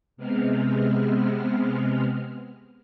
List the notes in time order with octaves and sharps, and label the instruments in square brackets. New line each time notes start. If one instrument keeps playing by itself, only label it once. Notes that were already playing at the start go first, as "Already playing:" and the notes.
[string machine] C3 G#3 B3 C4 F6